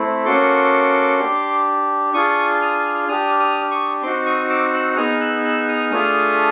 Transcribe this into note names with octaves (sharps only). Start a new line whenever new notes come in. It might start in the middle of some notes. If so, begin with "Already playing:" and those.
Already playing: A3 C4 E4
A#3 C#4 F#4 A4 C6 D6
D4 G4
D4 F4 G#4 C#6 D#6
D#6 F6
D4 G4 D#6 F6
D#6 F6
C#6 D#6
C4 D#4 F#4 C6 D6
C#6 D#6
D6 E6
E6 F#6
B3 D#4 G#4 D#6 F6
E6 F#6
E6 F#6
D#6 F6
A3 D4 F4 G#4 D#6 F6